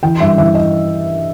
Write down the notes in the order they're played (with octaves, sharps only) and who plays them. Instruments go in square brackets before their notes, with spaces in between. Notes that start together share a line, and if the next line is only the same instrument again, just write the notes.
[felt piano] E3 G5
G2 E5
E3 E5
D#5